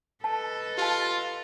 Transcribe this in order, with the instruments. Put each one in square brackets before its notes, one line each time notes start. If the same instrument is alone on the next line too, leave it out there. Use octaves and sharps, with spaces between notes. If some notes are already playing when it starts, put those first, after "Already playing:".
[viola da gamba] A4 B4 D#5 [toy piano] A5
[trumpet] F4 [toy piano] G4 A5